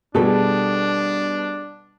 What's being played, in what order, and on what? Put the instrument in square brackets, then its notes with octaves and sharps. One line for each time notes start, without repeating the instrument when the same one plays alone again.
[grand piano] B2 G3 [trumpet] D4 [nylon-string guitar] G#4 A4